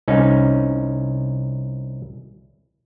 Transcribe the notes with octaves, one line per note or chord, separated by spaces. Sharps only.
C2 C#4 D#4